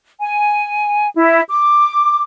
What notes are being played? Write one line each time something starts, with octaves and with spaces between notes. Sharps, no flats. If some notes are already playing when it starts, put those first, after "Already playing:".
G#5
E4
D6